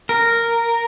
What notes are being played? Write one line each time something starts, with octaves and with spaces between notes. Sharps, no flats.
A#4